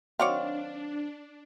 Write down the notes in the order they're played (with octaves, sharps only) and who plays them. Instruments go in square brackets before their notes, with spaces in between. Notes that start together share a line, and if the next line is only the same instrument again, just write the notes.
[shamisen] D#3 F#3 C4 [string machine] D4 [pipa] C#5 D5 F5